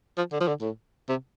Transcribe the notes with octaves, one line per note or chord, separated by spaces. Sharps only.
F3
D3
F3
D3
A2
C3